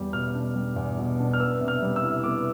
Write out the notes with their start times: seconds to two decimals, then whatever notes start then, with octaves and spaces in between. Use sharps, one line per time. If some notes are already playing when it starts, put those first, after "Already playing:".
Already playing: E2 G3
0.13 B2 F6
0.35 D4
0.55 G3
0.76 E2
0.98 B2
1.19 D4
1.33 F6
1.39 B3 E6
1.60 C3
1.68 F6
1.82 G3
1.96 E6
2.02 E4
2.23 B3 D6